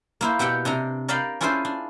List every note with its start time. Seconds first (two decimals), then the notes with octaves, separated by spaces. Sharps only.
0.21 A#3 E4 C5
0.39 B2 G4 E5 F#5 G5
0.65 C3 D4 D#5 A#5
1.08 A#4 D5 D#5 F5 G5 B5
1.41 C#4 D4 E4 F4 G#4 C5
1.65 D4